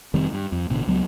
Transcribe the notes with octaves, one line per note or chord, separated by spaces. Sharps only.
F1 D#3 G3 C4
G2
F2
A1 B2 D3
C#2 F#3 B3